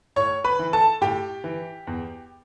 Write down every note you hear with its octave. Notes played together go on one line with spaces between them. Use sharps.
A2 C#5 C#6
B4 B5
E3
A4 A5
A2 G4 G5
E3
E2